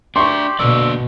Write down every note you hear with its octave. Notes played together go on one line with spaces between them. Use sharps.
D4 G4 E5 C6 C#6
B2 D3 A#3 D5 E6